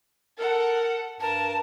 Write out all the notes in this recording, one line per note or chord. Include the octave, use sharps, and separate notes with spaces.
A4 A#4 F#5
G2 A#4 A5